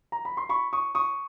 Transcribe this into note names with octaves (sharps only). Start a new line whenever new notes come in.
A#5
B5
C6
B5 C#6
C#6 D#6
C#6 D#6